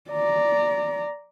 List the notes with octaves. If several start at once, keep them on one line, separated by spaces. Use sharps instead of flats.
D5 A#5